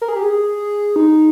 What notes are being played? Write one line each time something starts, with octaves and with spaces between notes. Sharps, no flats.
A#4
G#4
G4
G#4
D#4